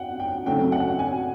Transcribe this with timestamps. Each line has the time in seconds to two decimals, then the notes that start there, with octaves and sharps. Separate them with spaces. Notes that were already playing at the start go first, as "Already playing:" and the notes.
Already playing: F#5 G5
0.20 G5
0.46 C#3 F#3 A3 C4 G5
0.72 F#5
0.99 G#5